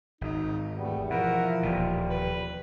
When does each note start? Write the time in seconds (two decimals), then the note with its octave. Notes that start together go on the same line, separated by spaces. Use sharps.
0.21 G#1 D#4
0.77 E2 G3 A3 B3
1.10 B2 E3 F3 E4 A#4 E5 F#5
1.63 D#1 D#2 B2 G3
2.10 B4